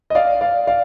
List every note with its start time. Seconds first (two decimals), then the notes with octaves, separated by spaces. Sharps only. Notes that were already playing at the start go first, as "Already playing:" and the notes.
0.10 D#5
0.15 D5 F5
0.41 D5 F5
0.67 D5 F5